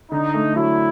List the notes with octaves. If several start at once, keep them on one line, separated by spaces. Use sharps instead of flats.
D3 D#4
A3
F#3 E4